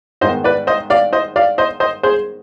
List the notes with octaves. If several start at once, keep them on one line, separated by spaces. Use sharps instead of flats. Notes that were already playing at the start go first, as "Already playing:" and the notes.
G#2 D#3 B3 C5 D#5
B4 D5
C5 D#5
D5 F5
C5 D#5
D5 F5
C5 D#5
C5 D#5
G#4 C5